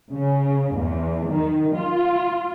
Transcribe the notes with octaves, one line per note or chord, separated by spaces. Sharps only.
C#3
E2
D#3
F4